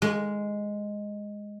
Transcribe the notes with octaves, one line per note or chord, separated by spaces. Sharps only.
G#3